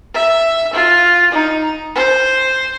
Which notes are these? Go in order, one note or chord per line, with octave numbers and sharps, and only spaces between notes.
E5
F4
D#4
C5